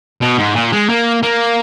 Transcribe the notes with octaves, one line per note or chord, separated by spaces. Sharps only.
B2
G#2
A#2
G#3
A#3
A#3